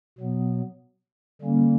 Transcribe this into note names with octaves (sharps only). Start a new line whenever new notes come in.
B2 F#3 B3
D3 G3 A#3 C#4